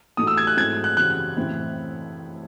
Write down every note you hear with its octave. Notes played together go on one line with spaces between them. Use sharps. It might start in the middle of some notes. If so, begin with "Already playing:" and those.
A2 E3 A3 D#4 F#4 D#6
E6
G#6
F#6
G#2 F#3 A3 C4 E4 G#6
F#6
C#3 E3 C4 F#4 F#6
A2 E3 C4 E4